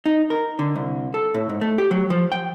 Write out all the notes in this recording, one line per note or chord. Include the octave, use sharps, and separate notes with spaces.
D#4
A#4
D3
C2
A4
A2
G#2
A3
G4
F#3
F3
G5